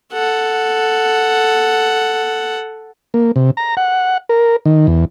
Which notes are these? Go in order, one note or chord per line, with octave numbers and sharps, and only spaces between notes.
A4 F#5
A#3
C3
A#5
F#5
A#4
D#3
E2